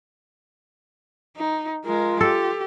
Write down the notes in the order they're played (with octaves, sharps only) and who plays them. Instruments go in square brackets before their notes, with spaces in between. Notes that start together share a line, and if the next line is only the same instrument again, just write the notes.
[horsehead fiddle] D#4
[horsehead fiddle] G#3 A#4 [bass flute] F4
[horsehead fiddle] G4 [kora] A4